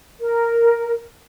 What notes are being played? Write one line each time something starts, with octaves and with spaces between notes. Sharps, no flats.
A#4